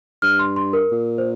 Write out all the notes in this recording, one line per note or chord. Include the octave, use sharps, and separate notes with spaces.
G2 F6
C6
C6
A#4
A#2
C5